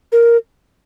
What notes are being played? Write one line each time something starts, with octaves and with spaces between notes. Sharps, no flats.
A#4